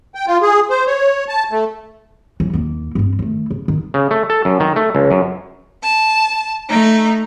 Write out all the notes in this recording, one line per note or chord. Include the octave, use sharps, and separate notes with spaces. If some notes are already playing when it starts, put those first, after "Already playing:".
G5
F4
G#4
C5
C#5
A5
A3
E3 F#3
D#2 A#3
G2 C4
D#3 A3
C#3
D#3
C#3
A3
A4
F#2
D#3
A3
C#2
F#2
A5
A3 D#4